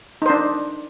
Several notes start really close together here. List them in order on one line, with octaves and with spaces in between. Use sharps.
D#4 C5 D4